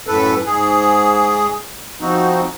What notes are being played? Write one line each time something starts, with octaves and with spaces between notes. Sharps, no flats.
F#2 A2 A4 B4
G#2 G#4
F3 C4 D#4 F#4